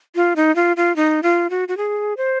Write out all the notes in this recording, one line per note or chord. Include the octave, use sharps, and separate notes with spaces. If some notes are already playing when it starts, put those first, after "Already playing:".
F4
D#4
F4
F4
D#4
F4
F#4
F#4
G#4
C5